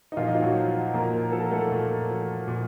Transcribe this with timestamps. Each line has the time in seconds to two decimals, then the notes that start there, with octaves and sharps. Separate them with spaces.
0.12 D#4
0.17 A#2 F3 F4
0.27 D#4
0.35 F4
0.42 F#3 F#4
0.55 F3
0.94 A#2 A#3 A#4
1.32 F3 A4
1.42 A#4
1.51 A3 A4
1.71 A#2
2.10 F3
2.48 A#2